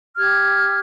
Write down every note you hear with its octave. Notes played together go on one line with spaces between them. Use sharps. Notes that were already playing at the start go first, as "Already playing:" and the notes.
G4 F6 G#6